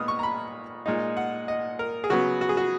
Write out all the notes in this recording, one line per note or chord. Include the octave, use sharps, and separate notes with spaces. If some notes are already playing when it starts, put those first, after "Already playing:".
Already playing: A#2 G#3 B3 D#4 D#6 F6
C#6
A#5
B5
A#2 G#3 D#4
F#5
D#5
A#4
G#4
C#3 F#3 B3 F#4
F#4
G#4
F#4